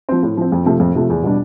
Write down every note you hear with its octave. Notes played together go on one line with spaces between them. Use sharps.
F3 C4
A2
F3 C4
F2
C3 F3 A3
F2
C3 F3 A3
E2
B2 G3 D4